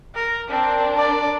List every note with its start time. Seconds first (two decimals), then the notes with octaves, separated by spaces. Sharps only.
0.15 A#4
0.50 C4 D4 A#4
0.97 D5